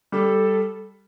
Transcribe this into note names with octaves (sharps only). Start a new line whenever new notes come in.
G3 A4